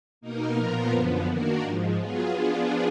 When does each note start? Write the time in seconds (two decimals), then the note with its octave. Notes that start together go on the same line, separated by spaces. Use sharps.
0.21 B2 A#3 D#4 A#4
0.55 A#2 F3 B3 F4 A#4
0.91 F#2 D3 F3 B3
1.26 D#3 A#3 D4 F#4 A#4
1.60 G#2 F3 G#3
1.95 F#3 B3 F4 G#4
2.29 F3 B3 D4 F4 G#4